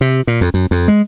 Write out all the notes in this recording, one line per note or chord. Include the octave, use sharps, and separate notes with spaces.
C3
A#2
F2
F#2
F2
G#3